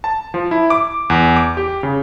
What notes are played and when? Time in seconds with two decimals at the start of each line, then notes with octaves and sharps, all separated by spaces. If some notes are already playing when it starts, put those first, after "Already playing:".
0.04 A5
0.34 F3
0.51 E4
0.70 D6
1.10 E2
1.36 D6
1.57 G4
1.83 C#3